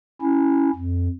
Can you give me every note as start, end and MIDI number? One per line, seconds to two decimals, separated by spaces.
0.22 0.70 61
0.22 0.70 64
0.75 1.08 41